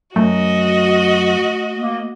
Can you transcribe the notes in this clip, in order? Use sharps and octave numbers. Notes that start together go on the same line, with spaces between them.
F#2 A3 F#4 D#5
A#3